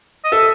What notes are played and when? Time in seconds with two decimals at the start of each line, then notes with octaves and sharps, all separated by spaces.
0.25 D#5
0.32 A4 E5